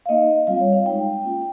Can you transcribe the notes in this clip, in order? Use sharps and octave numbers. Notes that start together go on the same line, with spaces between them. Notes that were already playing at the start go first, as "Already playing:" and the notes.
F5
A#3 D#4 D#5
G3 C4 F4 F5
C#5
F5
G#3 D#4 G5
A#3 C#4 F4